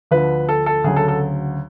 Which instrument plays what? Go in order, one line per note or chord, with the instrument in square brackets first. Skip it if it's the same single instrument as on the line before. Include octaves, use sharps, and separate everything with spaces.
[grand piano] D2 D3 F3 B4
A4
A4
D2 C#3 F#3 G#4
A4
A4